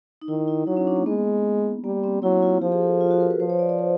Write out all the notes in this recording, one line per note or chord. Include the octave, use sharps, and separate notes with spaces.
D#4
D#3 E4
E4
F#3 D#4
C#4
D4
A#3
G#3 B3
G3 A#3
C4
F#3 E4
F4
F3 G4
G#4
A4
F4
F#4
A#4
B4
F3 C5
C#5
D5
D5
C5